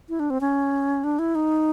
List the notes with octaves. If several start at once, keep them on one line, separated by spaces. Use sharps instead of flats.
E4
D4
C4
C#4
D4
E4
D#4